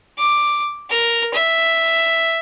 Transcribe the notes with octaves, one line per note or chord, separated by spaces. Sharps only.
D6
A#4
E5